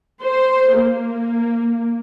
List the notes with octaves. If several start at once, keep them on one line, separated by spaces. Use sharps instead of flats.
C5
A#3